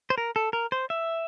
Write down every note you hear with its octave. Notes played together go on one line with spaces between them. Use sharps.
C5
A#4
A4
A#4
C5
E5